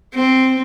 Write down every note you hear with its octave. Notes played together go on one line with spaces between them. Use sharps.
C4